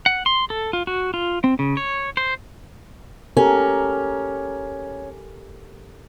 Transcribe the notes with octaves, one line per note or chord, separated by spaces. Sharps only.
F#5
C6
A4
F4
F#4
F4
C4
C#3
C#5
C5
C#4 G4 A4 A#4